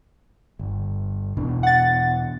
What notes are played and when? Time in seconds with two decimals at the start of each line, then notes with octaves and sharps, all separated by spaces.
0.59 G1
1.37 E2 B2 D4
1.63 F#5 A6